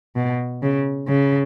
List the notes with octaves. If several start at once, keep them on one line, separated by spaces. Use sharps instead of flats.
B2
C#3
C#3